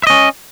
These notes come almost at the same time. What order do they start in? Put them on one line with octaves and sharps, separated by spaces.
E5 D#5 C#4